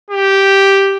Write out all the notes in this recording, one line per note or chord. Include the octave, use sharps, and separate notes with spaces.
G4